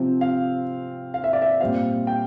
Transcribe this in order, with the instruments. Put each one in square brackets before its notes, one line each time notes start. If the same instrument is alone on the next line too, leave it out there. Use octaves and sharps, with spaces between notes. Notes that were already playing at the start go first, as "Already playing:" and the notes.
Already playing: [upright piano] C3 F3 C4
F5
F5
E5
D5
E5
A#2 G3 C4 F5
G5